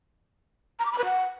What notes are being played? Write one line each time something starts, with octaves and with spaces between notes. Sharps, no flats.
A#5
D6
B5
B4
F#5